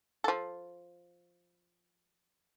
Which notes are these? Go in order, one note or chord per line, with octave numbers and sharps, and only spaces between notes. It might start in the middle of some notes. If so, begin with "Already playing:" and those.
F3 A4